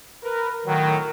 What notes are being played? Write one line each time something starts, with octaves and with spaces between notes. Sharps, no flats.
A#4 B4
A2 D#3 F#3